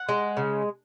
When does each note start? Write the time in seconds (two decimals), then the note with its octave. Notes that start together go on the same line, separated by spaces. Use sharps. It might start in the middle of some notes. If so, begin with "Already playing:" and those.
Already playing: F#5
0.09 G#3
0.37 C#3